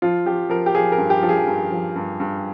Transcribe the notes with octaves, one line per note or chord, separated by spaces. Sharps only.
F3 F4
F3 G4
F3 A#4
G4
F3 G#4
A#4
G2
G4
F3
G#4
G2
F3
G2
G2